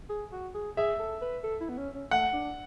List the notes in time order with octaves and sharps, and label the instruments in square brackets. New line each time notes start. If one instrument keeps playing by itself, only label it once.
[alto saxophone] G#4
F#4
G#4
[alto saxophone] G#4 [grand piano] E5
[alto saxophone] A4
B4
A4
E4
B3
C#4
C#4
[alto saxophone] A3 [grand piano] F#5
[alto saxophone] D4